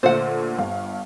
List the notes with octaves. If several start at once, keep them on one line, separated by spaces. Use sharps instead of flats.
A#2 D3 A3 C5 F#5
G1 G2 F5